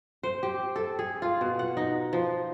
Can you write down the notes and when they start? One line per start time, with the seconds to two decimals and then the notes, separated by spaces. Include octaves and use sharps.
0.23 C5
0.43 G4
0.76 A4
0.99 G#4
1.22 F4
1.41 B2
1.59 F#5
1.77 D#4
2.13 F3